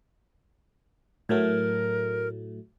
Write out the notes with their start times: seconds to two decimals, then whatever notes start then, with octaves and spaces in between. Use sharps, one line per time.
1.29 A2 F#3 A3 A#4